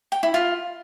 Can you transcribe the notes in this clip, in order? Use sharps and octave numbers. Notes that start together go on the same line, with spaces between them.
G5
E4
F4